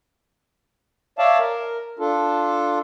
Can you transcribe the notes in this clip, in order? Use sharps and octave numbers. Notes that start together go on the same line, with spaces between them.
C#5 D5 E5 F5 A5
A#4
D4 F4 A4